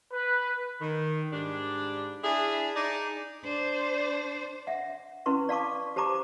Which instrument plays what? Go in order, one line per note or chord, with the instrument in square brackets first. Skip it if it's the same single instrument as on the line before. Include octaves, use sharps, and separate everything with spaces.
[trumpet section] B4
[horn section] D#3
G#2 G3 D4
D4 E4 G#4
D#4 G#4 D5
[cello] D4 C5
[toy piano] E5 F#5
C#4 E4 B4 C6 C#6
D5 F5 A5 C#6 D6
G4 C5 A5 A#5 D6